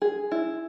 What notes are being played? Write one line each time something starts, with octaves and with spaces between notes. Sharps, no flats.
G#4
E4